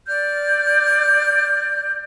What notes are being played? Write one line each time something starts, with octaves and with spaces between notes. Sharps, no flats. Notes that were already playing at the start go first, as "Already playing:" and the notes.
D5 F6 G6